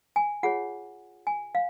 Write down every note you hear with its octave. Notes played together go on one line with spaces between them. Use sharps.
G#5
F4 G#4 C#5 F#5
G#5
F5